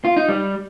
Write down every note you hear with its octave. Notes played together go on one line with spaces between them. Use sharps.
F4
D#4
G3